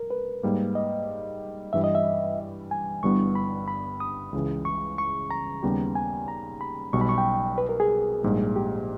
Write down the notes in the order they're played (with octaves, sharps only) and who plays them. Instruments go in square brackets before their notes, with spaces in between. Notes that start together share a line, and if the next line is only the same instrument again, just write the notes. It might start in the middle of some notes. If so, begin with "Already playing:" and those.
Already playing: [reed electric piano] A#4
B4
[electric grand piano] G#2 G3 A#3
[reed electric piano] D#5
[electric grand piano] G2 E3 G3 [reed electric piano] E5
[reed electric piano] D#5
E5
G#5
[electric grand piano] G1 G2 G3 B3 E4 [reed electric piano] C#6
[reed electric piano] B5
B5
D#6
[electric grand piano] C#2 C#3 E3
[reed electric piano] C#6
C#6
A#5
[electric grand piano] D#2 C#3 G3 B3 G4
[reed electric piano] G#5
A#5
B5
[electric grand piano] B1 B2 G3 [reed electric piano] C#6
[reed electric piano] B5
C#6
G5
B4
A#4
G#4
[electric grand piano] A#1 G#2 G3 A#3
[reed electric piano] G4